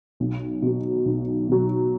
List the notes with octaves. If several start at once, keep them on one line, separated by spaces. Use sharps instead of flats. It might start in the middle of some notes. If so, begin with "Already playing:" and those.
B1
B2 F#3
B1
B2 F#3